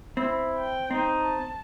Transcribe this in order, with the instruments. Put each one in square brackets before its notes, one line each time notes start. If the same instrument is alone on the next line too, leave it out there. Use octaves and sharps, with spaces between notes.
[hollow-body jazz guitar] C4 [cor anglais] E4
[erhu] G5
[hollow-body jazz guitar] C4 [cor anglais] D#4
[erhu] A5